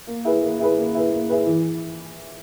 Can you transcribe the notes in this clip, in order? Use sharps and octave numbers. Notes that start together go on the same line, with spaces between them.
A#3
E4 G#4 B4
A#3
E4 G#4 B4
A#3
E4 G#4 B4
A#3
E4 G#4 B4
E3